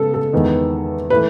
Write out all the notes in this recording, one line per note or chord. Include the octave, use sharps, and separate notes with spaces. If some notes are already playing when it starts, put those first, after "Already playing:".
Already playing: C#3 G#3 B3 A4
A4
E2 D#3 G#3 B3
E3 A3 B4